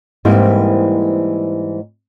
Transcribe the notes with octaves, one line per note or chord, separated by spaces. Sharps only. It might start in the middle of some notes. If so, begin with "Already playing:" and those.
G#2 E3 G3 A#3 C4 E4